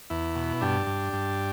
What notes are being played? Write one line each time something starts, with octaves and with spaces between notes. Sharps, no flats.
E2 E4
B2
G2 D4 G4
G2
G2